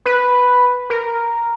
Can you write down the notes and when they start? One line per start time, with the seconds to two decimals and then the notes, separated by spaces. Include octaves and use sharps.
0.06 B4
0.90 A#4